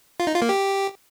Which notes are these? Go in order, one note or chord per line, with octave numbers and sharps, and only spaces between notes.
F4
D#4
F4
A#3
G4